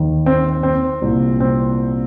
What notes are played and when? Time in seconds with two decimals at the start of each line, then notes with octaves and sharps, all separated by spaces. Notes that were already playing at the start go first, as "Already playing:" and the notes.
Already playing: D#2 D#3
0.26 C4
0.63 C4
1.02 C2 A#2
1.40 C4